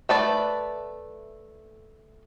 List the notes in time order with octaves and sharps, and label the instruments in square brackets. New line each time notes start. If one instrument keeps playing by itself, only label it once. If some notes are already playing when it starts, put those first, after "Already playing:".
[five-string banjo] A3 B4 D5